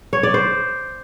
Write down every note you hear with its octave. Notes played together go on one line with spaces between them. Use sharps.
C#5
D5
C5